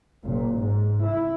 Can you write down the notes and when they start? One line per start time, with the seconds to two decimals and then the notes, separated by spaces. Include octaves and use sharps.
0.23 F#1 A#2
0.56 G#2
1.02 E4